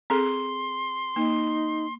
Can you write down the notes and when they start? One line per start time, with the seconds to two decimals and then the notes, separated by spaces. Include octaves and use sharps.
0.10 C4 G#4 A4 C6
1.16 A#3 D#4